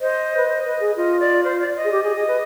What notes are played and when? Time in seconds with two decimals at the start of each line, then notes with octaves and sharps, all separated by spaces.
0.01 C5 D#5
0.37 B4
0.48 C5
0.65 B4
0.80 G#4
0.97 F4 D#5
1.20 D5
1.44 C5
1.60 D5
1.76 D#5
1.84 G#4
1.92 G4
2.03 G#4
2.16 G#4
2.28 B4